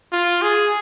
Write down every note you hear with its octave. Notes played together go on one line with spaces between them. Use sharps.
F4
G#4